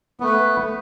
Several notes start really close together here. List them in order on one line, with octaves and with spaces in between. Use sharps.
B3 A3 B4